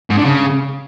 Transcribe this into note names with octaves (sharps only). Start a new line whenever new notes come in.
G#2
D3
C#3